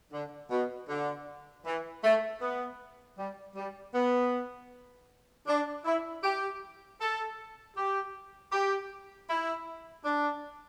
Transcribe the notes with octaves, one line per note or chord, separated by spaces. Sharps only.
D3
B2
D3
E3
A3
B3
G3
G3
B3
D4
E4
G4
A4
G4
G4
E4
D4